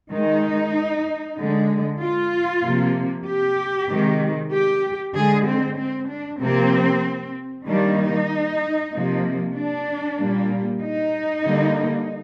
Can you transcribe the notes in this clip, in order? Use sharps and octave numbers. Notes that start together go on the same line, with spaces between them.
D#3 G#3 D#4
D3 G#3
F4
C3 F3 A#3
G4
C3 D#3 G#3
G4
D3 G#3 G#4
C4
C4
D4
C3 F3 A#3 C4
D#3 G3 A#3 D4
D#4
C3 F3 A#3
D4
A#2 G3 A#3
D#4
D3 G3 A#3